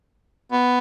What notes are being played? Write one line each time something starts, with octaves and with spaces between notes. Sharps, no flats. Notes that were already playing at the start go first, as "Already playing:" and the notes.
B3